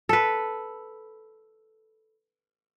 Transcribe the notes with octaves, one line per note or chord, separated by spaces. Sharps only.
A4 B4